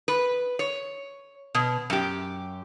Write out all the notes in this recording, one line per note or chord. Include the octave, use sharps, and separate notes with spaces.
B4
C#5
B2
F#2 G4